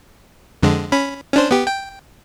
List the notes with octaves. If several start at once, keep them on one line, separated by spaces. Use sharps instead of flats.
F2 D3 G#3
C#4 B5
C#4 D4 C5
B3 G4
G5